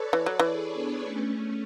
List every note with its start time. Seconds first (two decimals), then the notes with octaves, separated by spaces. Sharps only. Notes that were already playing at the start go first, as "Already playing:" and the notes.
Already playing: A4 B4 C#5 D5
0.13 E3 A4 C#5
0.26 F#3
0.39 E3 G#4 B4
0.72 B3 D4
1.02 A3 C#4